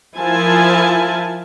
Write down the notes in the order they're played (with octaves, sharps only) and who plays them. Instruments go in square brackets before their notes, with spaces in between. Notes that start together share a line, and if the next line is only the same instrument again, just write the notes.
[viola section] F3 E4 F4 A#4 G#5 A5